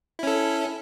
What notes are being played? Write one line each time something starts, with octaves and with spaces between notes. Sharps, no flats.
C#4 E4 A4